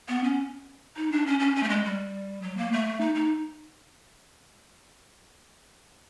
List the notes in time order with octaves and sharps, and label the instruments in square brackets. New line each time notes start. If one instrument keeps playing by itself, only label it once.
[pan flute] B3
C#4
D#4
D4
C#4
C#4
C#4
A3
G#3
G3
F#3
A#3
A3
D#4
D#4